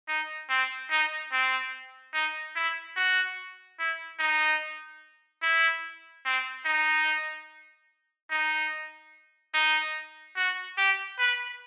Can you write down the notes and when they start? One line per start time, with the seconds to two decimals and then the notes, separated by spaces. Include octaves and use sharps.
0.09 D#4
0.50 C4
0.91 D#4
1.32 C4
2.14 D#4
2.56 E4
2.96 F#4
3.79 E4
4.19 D#4
5.42 E4
6.25 C4
6.66 D#4
8.31 D#4
9.54 D#4
10.36 F#4
10.78 G4
11.19 B4